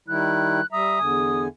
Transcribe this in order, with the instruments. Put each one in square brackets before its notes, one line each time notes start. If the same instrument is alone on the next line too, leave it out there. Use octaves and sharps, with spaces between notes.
[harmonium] D#3 G3 E4 [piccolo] F#6
[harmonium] G3 E5 A#5 [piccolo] D#6
[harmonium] E2 D3 G#5